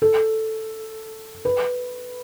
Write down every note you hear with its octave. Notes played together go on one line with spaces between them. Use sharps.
A4
B4